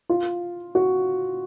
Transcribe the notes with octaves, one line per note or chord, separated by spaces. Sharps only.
F4
F#4